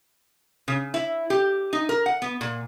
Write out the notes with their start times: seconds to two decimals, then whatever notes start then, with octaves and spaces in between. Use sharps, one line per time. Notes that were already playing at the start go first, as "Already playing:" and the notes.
0.68 C#3
0.94 E4
1.30 G4
1.73 D#4
1.89 A#4
2.06 F#5
2.22 B3
2.41 A#2